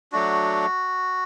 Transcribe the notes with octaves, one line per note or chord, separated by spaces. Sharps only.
F#3 A3 D4 F#4